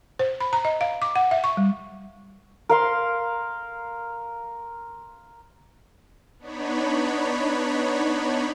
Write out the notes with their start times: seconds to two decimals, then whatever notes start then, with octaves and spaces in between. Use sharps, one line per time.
0.19 C5
0.40 B5
0.53 A#5
0.65 D#5
0.81 F5
1.02 D6
1.16 F#5
1.31 E5
1.44 C#6
1.57 G3
2.69 A#4 F5 C6
6.39 B3 D4 D#4 C#5 B5